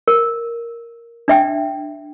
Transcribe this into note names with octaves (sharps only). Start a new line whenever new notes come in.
A#4
D4 E5 G5